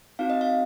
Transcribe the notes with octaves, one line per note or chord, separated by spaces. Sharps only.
C4 D#4 F#4 F5
D#5
F5